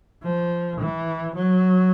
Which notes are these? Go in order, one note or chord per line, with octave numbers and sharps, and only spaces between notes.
F3
E3
F#3